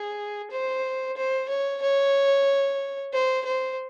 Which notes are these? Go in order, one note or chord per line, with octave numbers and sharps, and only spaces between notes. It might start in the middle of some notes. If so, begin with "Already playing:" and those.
Already playing: G#4
C5
C5
C#5
C#5
C5
C5